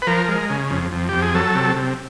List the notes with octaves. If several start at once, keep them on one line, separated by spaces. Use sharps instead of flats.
B4
F3 A#4
G#3
C#3
F2
F2
F2 G4
G#4
F#3 A4
C3
C3